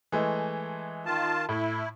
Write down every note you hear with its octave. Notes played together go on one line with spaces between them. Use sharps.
E3 G#3 A3
D#3 F4 A5
A2 E4